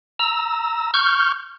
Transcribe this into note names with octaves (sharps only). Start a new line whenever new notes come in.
A#5 E6
C#6 F6 G6